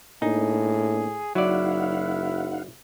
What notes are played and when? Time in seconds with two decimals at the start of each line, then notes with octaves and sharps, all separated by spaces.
0.22 A2 A#3 D4 D#4 G#4
1.35 F#1 F#3 D#4 E4 D5 F5 F#5